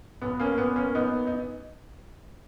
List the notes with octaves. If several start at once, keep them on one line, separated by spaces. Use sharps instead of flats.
B1 B3
A#3 C#4
A#2 B3
A#3 C#4
B1 B3 D#4
D#4